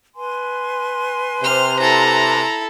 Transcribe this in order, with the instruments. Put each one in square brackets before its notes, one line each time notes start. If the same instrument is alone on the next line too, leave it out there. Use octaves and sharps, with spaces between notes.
[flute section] B4 G#5 C6
[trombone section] C3 [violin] C5 F6
[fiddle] E4 A4 [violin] A#5